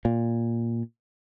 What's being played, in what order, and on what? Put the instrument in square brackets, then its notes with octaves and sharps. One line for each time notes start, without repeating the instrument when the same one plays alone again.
[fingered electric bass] A#2